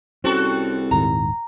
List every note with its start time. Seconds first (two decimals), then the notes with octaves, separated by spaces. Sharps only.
0.24 C2 C4 C#4 F#4 A4
0.91 D#1 G#2 D#3 A#5